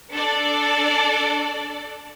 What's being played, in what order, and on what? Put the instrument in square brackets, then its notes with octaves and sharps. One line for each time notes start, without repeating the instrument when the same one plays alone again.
[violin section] D4 A4 D5